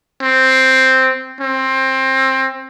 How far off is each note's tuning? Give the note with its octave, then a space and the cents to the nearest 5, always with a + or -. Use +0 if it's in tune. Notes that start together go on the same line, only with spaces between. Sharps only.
C4 +0
C4 +20